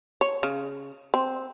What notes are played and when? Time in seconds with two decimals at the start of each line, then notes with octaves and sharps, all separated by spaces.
0.21 C#5
0.43 C#3
1.14 C4